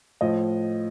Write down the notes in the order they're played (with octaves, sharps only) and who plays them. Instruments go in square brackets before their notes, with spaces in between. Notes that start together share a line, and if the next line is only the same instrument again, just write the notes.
[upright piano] A2 F3 D#5